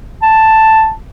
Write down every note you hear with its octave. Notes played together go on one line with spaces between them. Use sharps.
A5